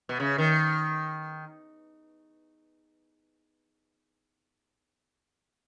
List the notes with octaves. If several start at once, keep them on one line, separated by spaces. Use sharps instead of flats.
B2
C#3
D#3